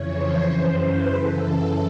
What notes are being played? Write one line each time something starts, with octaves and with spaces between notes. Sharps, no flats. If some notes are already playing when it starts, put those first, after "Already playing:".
Already playing: F2 C#3 E3 C#5
C5
F#2 C#3 E3
B4
F#2 C#3 E3 A4